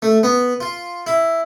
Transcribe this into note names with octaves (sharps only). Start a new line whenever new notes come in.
A3
B3
F4
E4